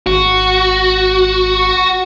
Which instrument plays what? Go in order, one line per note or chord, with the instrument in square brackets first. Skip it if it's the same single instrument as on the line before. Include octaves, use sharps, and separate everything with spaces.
[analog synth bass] G#1 [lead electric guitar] F#4